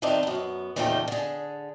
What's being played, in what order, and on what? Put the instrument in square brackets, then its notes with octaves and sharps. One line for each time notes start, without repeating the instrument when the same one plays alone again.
[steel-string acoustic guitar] D#3 A3 C4 D4 D#4
F#2 B3
E2 A#2 C#3 A3 D#4 G5
D3 G#4